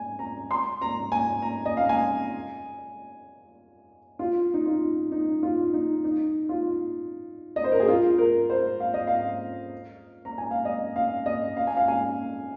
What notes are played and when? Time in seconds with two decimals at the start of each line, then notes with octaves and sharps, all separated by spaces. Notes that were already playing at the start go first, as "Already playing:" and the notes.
Already playing: G#5
0.19 A#5
0.51 C6
0.82 A#5
1.12 G#5
1.42 A#5
1.66 D#5
1.77 F5
1.89 G#5
4.19 F4
4.54 D#4
4.66 F4
5.12 D#4
5.43 F4
5.73 D#4
6.04 D#4
6.49 F4
7.56 D#5
7.64 C5
7.72 A#4
7.80 G#4
7.88 F4
8.18 A#4
8.50 C5
8.80 F5
8.94 D#5
9.07 F5
10.25 A#5
10.38 G#5
10.51 F5
10.65 D#5
10.96 F5
11.26 D#5
11.57 F5
11.67 G#5
11.77 F5
11.88 G#5